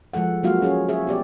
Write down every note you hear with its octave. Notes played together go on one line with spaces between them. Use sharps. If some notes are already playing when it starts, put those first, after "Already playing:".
F3 G#3 A4 F#5
F#3 G#3 A#3 F4 F#4 F5
C#4 G#4 C#5
G#4 C#5 E5
B3 G4 D5